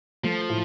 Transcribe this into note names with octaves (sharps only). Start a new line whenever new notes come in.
F3 A3
A2